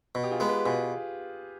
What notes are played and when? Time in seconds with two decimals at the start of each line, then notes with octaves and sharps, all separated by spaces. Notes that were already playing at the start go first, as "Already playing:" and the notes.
0.15 B2
0.23 G4
0.31 F4 G#4
0.40 G#3 B3
0.49 G4 B4
0.66 B2 F4 G#4